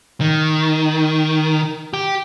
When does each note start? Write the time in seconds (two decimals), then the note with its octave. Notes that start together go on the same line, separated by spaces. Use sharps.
0.21 D#3
1.93 G4